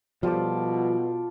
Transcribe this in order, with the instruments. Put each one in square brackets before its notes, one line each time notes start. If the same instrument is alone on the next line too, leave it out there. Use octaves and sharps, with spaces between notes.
[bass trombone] B2 [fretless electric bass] F3 G3 [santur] F4 A4 D5